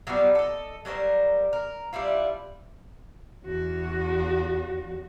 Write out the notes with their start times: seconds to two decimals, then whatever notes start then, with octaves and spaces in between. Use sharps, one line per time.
0.07 F#3 G3 B3 F4
0.35 A4 D#5
0.85 F#3 G3 A#4 C5
1.53 A#4
1.93 G3 D4 E4 F4
3.45 E2 F#4